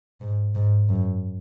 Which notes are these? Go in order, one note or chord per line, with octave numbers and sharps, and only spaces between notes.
G#2
G#2
F#2